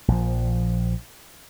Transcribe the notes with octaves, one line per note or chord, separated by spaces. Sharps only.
A#1 F3